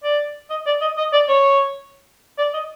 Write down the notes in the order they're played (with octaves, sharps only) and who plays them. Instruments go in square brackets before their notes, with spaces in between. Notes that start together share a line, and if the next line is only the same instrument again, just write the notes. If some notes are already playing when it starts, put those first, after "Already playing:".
[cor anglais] D5
D#5
D5
D#5
D#5
D5
C#5
D5
D#5